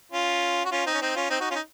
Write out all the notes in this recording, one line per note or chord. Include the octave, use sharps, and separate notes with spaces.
C#4 F4
F#4
C#4 F4
C4 D#4
C#4
C4 D#4
C#4 F4
C4 D#4
D#4 F#4
C#4 F4
D#4